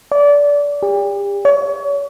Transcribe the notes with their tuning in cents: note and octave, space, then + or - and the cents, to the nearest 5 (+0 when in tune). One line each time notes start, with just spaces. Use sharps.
D5 -25
G4 +40
C#5 +35